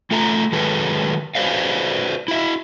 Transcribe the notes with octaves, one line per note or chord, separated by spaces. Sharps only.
A3 F4 A4 E5 A#5
D#3 F#3 G#3 A4 B4
F#4 B4 C5 D5 F5
E4 F#4 E5